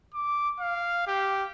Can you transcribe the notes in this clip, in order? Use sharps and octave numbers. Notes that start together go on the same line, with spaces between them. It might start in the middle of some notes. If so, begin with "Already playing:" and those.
D6
F5
G4